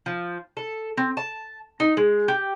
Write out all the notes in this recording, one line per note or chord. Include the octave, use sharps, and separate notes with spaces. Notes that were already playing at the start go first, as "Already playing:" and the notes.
F3
A4
C4
A5
D#4
G#3
G4